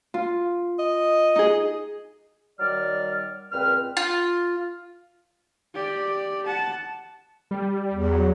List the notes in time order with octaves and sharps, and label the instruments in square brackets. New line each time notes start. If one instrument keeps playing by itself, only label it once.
[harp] F4
[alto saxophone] D#5
[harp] D#4 G#4
[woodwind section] D#3 F#3 G3 D5 F6
C#2 A#2 C4 B4 F6
[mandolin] F4
[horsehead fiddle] G4 D5
F#5 A5
[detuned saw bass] G3
[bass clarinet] E2
[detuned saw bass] F#3